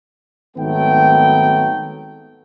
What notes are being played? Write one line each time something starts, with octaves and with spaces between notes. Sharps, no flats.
G#1 D#3 F#3 A3 B3 G5